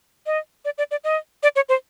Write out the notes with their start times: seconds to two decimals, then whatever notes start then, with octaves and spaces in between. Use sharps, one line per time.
0.26 D#5
0.65 D5
0.78 D5
0.91 D5
1.04 D#5
1.43 D5
1.56 C#5
1.69 C5